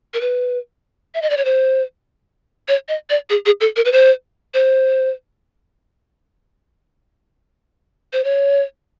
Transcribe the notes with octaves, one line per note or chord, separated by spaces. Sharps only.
A#4
B4
E5
D#5
D5
C#5
C5
C#5
D#5
D5
G#4
G#4
A4
A#4
B4
C5
C5
C5
C#5